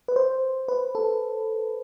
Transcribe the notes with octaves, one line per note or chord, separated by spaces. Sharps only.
B4
C5
B4
A4